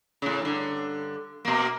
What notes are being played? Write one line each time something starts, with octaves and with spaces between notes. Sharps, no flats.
A2 C#3
G2 D3
B2 A#3